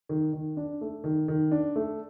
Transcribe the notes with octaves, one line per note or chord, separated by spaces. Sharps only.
D#3
D#3
D4
A3
D#3
D#3
D4
A3